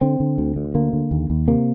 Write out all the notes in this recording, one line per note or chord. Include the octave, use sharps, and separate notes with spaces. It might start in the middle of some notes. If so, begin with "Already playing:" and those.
D3 C4
D3
D2
D2
D3 A#3
D3
D#2
D#2
C3 A#3